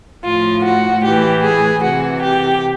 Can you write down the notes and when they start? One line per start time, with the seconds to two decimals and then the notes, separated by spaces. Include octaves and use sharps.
0.24 A2 F3 F4
0.64 F#4
1.03 A2 E3 G4
1.43 G#4
1.83 C3 E3 F#4
2.22 G4